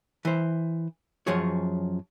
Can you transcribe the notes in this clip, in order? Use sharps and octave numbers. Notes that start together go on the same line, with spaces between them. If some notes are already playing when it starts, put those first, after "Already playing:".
E3 C5
F#2 F3 G#4 C#5